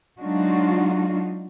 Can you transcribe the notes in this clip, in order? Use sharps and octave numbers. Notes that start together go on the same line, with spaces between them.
F#3 G#3 D4 D#4 F4 F#4